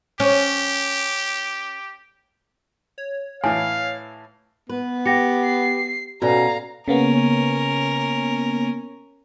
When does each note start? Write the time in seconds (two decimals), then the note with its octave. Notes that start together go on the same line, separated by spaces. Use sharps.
0.20 C#4 G4
2.98 C#5
3.44 A2 E3 F5 G#5
4.69 B3 B4
5.06 G4 F#5 A#6 C#7
5.44 C7
6.22 B2 C#4 F#4 A4 D5 F5 A#5
6.88 C#3 A#3 B3 C#4 A#4